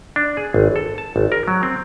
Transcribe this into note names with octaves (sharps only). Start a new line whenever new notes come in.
D4
G#4
G#1
A4
A5
G#1
A#4
F#3
C4